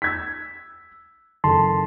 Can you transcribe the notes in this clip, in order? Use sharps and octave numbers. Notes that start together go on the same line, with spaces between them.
E6 G#6 B6
F#1 A4 A5 C6